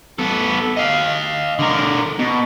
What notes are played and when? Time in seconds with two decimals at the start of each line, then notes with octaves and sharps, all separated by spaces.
0.18 B3 A4
0.77 D#5 F5
1.59 D3 A#4
2.19 B2